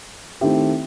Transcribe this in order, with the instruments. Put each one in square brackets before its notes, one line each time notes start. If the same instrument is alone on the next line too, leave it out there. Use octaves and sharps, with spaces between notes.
[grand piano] D#3 A3 C4 E4 G4